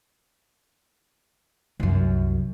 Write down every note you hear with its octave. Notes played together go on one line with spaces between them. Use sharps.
C2 F#2